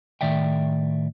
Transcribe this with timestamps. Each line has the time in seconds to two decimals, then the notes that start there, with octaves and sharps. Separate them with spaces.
0.21 A2 D#3 D5 E5 G5